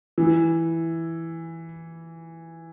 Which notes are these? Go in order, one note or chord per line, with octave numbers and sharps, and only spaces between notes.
E3